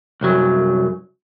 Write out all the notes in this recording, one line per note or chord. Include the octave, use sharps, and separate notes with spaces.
C2 F#2 F#3